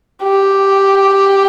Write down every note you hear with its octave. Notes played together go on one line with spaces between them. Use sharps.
G4